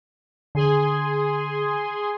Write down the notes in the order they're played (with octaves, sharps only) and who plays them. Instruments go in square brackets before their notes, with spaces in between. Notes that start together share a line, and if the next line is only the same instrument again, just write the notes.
[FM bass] D3 [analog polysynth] G#4 G#5 C6